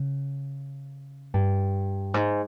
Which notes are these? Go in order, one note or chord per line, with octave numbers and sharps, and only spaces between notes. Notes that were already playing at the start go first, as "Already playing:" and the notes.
Already playing: C#3
G2
G#2